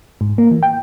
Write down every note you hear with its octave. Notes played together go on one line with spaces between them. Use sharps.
G#2
A#3
E3
G5